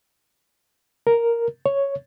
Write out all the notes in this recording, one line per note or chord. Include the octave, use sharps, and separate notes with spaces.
A#4
C#5